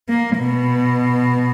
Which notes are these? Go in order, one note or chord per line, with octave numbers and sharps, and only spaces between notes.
A#3
B2